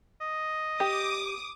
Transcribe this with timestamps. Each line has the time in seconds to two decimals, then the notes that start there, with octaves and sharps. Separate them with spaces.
0.21 D#5
0.80 G4 D6 D#6